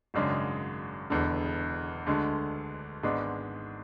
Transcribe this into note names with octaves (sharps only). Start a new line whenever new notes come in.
G#1 F#2 C#3 G#3 D4
E1 E2 D3
D2 D3 G#3
G#1 G#2 G#3 B3 D4